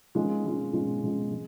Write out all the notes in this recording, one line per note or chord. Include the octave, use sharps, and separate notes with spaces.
D#3 G#3 C#4 F4
D#3 G#3 C#4 F4
D#3 G#3 C#4 F4
D#3 G#3 C#4 F4
G#3